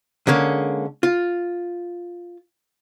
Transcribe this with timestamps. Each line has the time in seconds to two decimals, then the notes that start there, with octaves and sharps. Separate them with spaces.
0.27 D3 G#3 A#3 C#4
1.03 F4